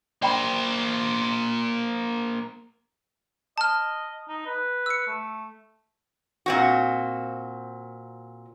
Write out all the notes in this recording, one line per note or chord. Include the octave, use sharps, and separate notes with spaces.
A#3 C5 D5 G5 B5
D#5 A5 F6
D#4
B4
E6 C#7
A3
A#2 C4 F#4